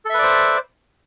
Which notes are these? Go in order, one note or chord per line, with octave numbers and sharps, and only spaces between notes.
A4 B4 C5 D5 E5